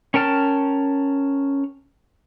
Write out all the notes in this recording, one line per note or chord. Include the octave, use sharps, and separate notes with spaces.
C#4 A#4 G5 A5 F6